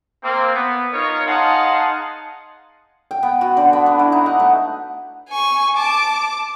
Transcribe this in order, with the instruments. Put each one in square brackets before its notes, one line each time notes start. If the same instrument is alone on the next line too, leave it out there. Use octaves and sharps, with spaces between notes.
[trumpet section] A#3 C4
B3
D#4 F4 A#4 C#5
D#4 G#4 F5 F#5 A5 C6
[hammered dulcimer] G5
B3
F#4
D3
B3
D4
E4
D#4
F#5
A3
[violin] G#5 C#6
A5 D6